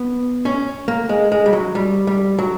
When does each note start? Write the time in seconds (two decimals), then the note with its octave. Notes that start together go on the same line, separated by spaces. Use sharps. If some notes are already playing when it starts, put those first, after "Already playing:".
Already playing: B3
0.45 C#4
0.88 A#3
1.09 G#3
1.32 G#3
1.46 G3
1.53 F#3
1.75 G3
2.07 G3
2.39 F#3